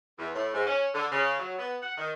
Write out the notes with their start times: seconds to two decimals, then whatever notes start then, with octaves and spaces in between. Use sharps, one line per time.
0.19 E2
0.35 A2
0.54 G#2
0.67 C#4
0.94 D3
1.12 C#3
1.39 F#3
1.59 B3
1.82 F#5
1.97 D#3